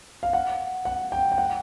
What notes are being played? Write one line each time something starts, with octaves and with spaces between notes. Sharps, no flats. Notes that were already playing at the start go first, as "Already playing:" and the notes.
F5
F#5
F#5
G5
G5
F#5